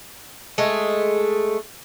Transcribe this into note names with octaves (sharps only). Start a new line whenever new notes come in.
G#3 A3